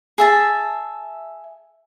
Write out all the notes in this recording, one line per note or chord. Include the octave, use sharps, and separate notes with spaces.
G#4 E5 A5